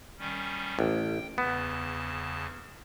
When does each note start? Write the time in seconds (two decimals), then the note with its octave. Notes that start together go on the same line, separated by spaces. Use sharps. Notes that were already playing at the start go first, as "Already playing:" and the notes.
0.18 D#3 G3 C#4
0.79 A1 G5
1.38 E2 C#3 B3 A5